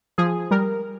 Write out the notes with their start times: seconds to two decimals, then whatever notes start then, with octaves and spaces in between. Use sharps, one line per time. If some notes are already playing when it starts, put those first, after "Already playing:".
0.18 F3 G#4
0.51 G3 A#4